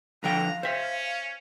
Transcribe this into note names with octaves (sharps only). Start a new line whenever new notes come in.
D3 F3 F5 G5 A#5
C#4 C5 E5